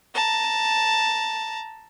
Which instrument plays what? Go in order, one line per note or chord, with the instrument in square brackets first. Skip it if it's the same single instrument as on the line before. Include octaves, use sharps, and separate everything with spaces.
[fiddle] A5 A#5